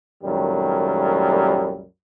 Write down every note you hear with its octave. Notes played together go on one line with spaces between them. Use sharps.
C2 F#2 A#2 D#3 G3 A3